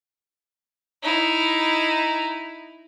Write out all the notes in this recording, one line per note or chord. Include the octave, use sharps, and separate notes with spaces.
D#4 E4